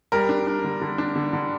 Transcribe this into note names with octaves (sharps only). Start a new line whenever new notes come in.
G3 A#4
D4
D4
D3
D3
D4
D3
D3